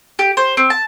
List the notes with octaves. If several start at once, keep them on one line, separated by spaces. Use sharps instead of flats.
G4
C5
C4
A5